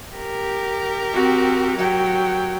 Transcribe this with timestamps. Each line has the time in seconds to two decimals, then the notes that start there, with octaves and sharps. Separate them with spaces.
0.15 G4 A#4
1.13 C4 F#4
1.77 F#3 G5